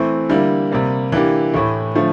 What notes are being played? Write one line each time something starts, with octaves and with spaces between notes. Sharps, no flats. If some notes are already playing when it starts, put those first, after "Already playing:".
Already playing: E3 A3 C4
D3 G3 A#3 E4
C3 G3 A#3
E3 A#3 D4 G4
A2 E3 A3 E4
D3 F3 A3